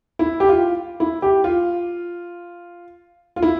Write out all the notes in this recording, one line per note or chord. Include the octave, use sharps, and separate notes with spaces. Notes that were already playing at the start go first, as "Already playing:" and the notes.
E4
G4
F4
E4
G4
F4
F4
E4